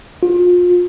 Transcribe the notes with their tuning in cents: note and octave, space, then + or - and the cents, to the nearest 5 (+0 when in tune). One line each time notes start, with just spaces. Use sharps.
F4 +30